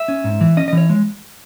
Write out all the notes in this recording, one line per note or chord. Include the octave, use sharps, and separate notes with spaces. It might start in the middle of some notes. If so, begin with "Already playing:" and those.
Already playing: E5
C#4
G#2
E3
C#4 D#5
D#5
E3 C#5
G#3